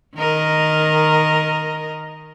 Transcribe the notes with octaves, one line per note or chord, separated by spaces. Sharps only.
D#3 A#4 D#5